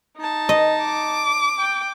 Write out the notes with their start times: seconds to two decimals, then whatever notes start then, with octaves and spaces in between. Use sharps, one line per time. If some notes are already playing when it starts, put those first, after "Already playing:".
0.17 D#4 A5
0.49 D#5
0.82 D6
1.58 G5